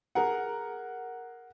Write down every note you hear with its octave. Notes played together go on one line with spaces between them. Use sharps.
G#4 A#4 F#5